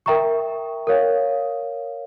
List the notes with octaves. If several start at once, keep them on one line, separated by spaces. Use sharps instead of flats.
A#4 E5 G5 A#5 C#6
A#4 C#5 F5